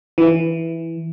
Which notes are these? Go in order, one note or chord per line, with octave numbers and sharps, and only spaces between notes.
E3